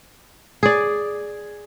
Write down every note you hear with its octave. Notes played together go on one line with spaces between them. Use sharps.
G#4 D5